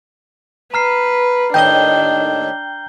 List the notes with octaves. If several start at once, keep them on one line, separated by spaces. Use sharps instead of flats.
B4 A#5 F6 C7
D#2 A2 D4 D#5 G5 G6 G7